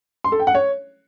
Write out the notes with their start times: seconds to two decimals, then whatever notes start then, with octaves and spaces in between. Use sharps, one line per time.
0.24 C6
0.32 A4
0.40 G5
0.47 F#5
0.55 C#5